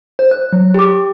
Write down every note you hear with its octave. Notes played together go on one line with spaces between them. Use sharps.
C5
F#6
F#3
G4 D6